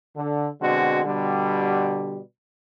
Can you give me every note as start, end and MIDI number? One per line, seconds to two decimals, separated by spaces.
0.16 0.48 50
0.61 1.00 47
0.61 1.00 50
0.61 1.00 56
0.61 1.00 60
0.61 1.00 66
1.05 2.20 47
1.05 2.20 50
1.05 2.20 55